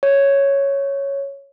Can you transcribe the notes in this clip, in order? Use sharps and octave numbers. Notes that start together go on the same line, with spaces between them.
C#5